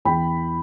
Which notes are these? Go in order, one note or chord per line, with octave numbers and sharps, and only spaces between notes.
E2 G5 B5